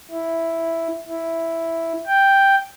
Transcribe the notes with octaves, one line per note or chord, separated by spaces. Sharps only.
E4
E4
G5